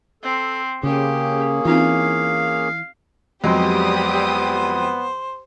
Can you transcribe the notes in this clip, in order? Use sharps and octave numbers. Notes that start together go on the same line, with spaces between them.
C4 A4
C#3 A#3 C#4 G4 G#4
E3 C4 D#4 F4 F5
F2 F#3 G#3 B3 G4 C5 D5 D#6